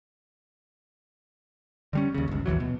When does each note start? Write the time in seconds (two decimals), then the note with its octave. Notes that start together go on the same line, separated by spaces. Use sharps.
1.93 D3 G3 C#4
2.14 D#2 C#3
2.28 G1 C#2
2.46 A1 D#2 E3 F#3
2.60 B2